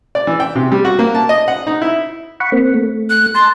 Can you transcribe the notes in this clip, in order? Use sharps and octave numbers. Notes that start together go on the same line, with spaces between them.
D5
E3
G5
C3
G3
F#4
A#3
A5
D#5
F#5
D#4
E4
F#5 B5 C#6
A#3 C4
A3
F#6
A5 C6